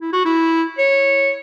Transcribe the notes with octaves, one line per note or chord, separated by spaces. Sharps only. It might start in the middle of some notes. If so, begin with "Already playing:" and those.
E4
F#4
E4
C#5